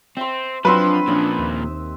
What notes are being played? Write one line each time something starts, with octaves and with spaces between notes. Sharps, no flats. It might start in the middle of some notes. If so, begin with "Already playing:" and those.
C4 E5 C6
F3 F#3 C4 D4 B4 C5 C6
A#2 F3 C#4 D4 E5 G5 D#6
D#2